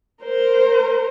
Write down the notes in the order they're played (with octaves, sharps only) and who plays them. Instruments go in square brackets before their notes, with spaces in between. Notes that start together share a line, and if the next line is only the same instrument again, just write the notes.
[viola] A#4 C5